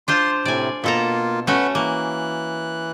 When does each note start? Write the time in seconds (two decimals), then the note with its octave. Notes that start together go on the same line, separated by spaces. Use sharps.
0.08 D4 F4 C5 C6
0.45 A2 C3 D5 G#5
0.84 B2 A#3 F4 A4 A#5
1.47 A3 C#4 F#4 B4 F#5
1.75 E3 A#3 F#6